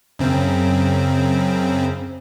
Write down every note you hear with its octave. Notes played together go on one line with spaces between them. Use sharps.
F#2 C#3 C4